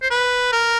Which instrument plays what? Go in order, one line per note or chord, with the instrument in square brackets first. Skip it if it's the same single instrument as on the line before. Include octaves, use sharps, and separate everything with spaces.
[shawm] C5
B4
A#4